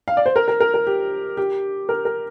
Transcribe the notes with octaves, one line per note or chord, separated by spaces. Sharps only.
F5
D5
C5
A#4
A#4
A#4
A#4
G4
G4
A#4
A#4